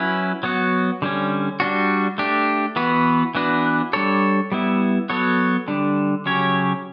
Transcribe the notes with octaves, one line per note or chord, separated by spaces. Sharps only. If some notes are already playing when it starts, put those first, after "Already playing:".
Already playing: F#3 C#4 E4 B4
F#3 B3 F#4
D3 G3 C#4
G3 D4 F#4
A3 D4 G4
E3 B3 F#4 B4
E3 B3 D4 F#4 B4
G3 D4 A4 C#5
G3 B3 E4
F#3 B3 F#4 A4 C#5
D3 G3 D4
C#3 F#3 C#4 G4 C#5